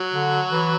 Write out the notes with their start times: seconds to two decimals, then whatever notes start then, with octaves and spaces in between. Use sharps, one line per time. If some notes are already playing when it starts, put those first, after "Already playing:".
Already playing: F#3
0.14 D3
0.52 E3